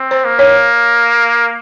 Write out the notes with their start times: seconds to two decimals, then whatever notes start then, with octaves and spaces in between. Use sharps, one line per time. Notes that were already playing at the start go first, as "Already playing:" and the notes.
Already playing: C4
0.11 C5
0.25 A#3
0.39 C#5